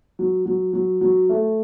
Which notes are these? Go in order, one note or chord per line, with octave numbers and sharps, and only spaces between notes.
F#3
F#3
F#3
F#3
A3